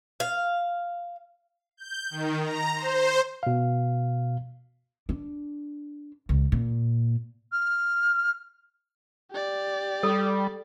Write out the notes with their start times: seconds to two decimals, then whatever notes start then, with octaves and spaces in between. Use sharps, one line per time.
0.20 F5
1.77 G6
2.10 D#3
2.41 A#5
2.75 C5
3.43 B2 F5
5.09 D4
6.29 C#2
6.52 A#2
7.52 F6
9.31 G4 D5
10.03 G3 A4